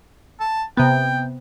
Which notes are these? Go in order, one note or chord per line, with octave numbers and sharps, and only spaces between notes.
A5
C3 B3 G5